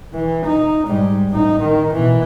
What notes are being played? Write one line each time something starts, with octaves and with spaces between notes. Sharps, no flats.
E3
D#4
G#2 G3
A1 D#4
D#3
B2 E3